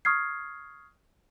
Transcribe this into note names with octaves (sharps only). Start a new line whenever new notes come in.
C#6 D#6 F6 G#6 C7